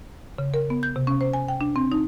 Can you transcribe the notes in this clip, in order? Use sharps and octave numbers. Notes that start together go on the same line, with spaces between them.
C#3
A#4
B3
G6
C3
C#4
C5
G#5
G5
D4
C4
D#4